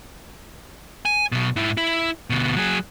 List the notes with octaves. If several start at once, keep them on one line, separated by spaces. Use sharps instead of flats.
G#5
B1 B2
G#2 E4
E4
D2 B2
F#3 G#4